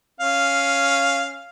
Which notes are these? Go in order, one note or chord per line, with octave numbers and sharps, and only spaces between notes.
C#4 F5